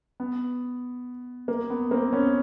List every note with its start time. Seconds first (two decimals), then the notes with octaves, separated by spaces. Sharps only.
0.20 B3
1.48 A#3
1.70 B3
1.91 A#3 C4
2.13 B3 C#4